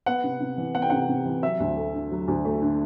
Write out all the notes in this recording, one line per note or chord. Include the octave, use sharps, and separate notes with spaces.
B3 F#5
C3
C3
E3
B3 F#5
G5
C3 F#5
C3
E3
F#3 E5
D2
A3
D3
F#3
D2
A3
D3